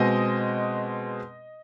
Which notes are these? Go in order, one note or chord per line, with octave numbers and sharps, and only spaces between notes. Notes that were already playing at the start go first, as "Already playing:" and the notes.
Already playing: B2 G#3 C4 D#5